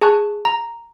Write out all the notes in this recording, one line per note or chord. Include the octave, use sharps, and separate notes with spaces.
G#4 G#5 A5 C#6 F#6
A#5